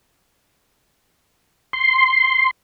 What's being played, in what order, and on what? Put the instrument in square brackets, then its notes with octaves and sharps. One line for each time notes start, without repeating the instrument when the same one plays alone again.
[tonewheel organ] C6